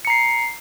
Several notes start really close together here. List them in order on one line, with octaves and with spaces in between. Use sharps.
C#7 A#5 C7